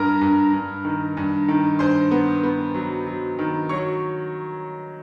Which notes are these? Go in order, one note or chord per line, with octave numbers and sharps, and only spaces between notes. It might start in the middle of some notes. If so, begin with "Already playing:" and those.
Already playing: G2 A#4 A#5
G2
G2
D#3
G2
D#3
G2 C5 C6
B3
B3
F#3
F#3
D#3
F#3 C#5 C#6